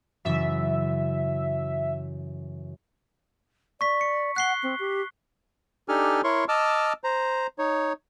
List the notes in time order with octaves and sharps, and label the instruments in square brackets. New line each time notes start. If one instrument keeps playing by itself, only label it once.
[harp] F#2 C#3 E3 [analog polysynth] E5
[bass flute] D5 [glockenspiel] C#6 B6
[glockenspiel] C#7
[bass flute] F#5 [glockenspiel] F#6 C7 G7
[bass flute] C4
G4
[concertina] D4 D#4 G4 A4 G#5 F6
E4 A#4 C#5 C6 C#6
D#5 A5 D6 E6 F6
C5 A#5
D#4 C#5